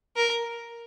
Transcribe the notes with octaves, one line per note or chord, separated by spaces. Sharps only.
A#4